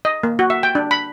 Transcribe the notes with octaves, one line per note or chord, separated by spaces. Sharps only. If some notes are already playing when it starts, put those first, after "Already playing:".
D#5
A#3
F#4
E5
G5
D4
B5